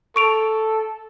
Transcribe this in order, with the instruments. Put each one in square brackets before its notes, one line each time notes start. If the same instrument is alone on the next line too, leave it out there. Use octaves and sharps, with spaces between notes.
[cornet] A4 [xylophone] C#6 D7 F7